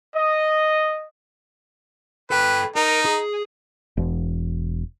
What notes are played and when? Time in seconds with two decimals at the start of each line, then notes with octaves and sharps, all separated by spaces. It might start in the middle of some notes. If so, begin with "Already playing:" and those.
0.14 D#5
2.31 A4 B4 G5
2.76 D#4 A#4
3.05 G#4
3.97 E1